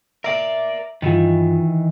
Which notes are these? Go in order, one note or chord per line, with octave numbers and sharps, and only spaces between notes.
A#4 D5 E5
G2 D#3 E3 F4